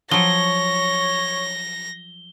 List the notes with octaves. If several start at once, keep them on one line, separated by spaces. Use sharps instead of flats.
F3 F#3 C#5 A#6 G7